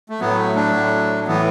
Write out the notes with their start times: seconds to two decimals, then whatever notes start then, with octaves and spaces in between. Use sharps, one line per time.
0.09 A3
0.20 A2 F#3 B3
0.38 A3
0.56 A3 D4
0.74 A2 F#3
1.27 A2 E3 B3